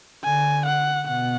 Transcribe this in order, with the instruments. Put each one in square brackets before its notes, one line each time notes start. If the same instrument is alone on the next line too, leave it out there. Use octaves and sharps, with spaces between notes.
[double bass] D3 [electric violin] G#5
[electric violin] F#5
[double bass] B2 [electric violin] F#5